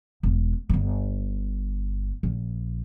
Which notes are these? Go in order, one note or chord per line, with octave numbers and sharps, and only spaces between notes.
E1
D1 G1
A#1